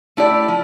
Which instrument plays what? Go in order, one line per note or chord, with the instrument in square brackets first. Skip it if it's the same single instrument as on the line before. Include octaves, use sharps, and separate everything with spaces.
[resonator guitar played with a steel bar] A3 E4 G4 D5
F3